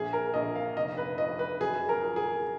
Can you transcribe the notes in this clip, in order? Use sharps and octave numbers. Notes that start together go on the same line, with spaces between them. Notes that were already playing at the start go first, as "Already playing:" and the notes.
Already playing: A#1 A#3 G#4
A#4
A#1 D#5
F5
F1 D#5
B4
F2 D#5
B4
F#2 G#4
A#4
F3
G#4